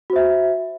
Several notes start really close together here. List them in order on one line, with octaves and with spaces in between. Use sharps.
F#4 C5 E5